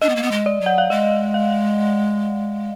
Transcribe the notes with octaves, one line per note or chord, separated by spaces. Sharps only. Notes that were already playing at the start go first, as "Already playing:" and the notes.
D4 D#5
B3
A#3
B3
G#3
D5
F#3
F#5
F5
G#3 D#5
F5